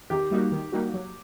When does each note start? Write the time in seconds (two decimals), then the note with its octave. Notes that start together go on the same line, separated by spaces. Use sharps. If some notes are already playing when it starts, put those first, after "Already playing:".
0.10 D#3 G4
0.31 G3 A#3 D#4 F#4
0.52 D#3
0.72 G3 A#3 D#4 F#4
0.94 F#3